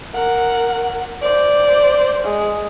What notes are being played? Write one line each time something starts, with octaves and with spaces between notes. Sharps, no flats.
A#4 F#5
C5 D5
G#3